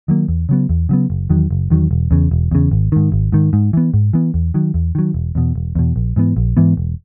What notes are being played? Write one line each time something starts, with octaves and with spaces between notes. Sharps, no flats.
D#3 F#3 A#3
E2
C#3 F#3 B3
E2
C#3 F#3 B3
F#1
E2 D#3 F#3
F#1
E2 D#3 F#3
E1
E2 C#3
E1
E2 C#3
G#1
G#2 D#3
G#1
G#2 D#3
G#2
E3 B3
G#2
E3 B3
E2
D#3 F#3
E2
D#3 F#3
E1
E2 B2
E1
E2 B2
A#1
G#2 E3 B3
A#1
G#2 E3 B3
E1